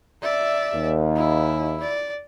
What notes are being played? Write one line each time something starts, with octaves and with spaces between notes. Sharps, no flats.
D5 E5
D#2
E4
D5